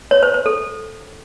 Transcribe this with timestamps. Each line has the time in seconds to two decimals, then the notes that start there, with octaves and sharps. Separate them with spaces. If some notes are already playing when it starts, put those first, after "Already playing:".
0.11 C#5
0.23 C5
0.34 C5
0.46 A4